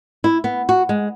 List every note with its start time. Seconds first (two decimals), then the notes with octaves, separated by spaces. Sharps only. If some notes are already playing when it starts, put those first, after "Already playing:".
0.24 E4
0.44 B3
0.69 F#4
0.89 G#3